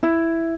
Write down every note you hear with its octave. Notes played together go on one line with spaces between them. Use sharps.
E4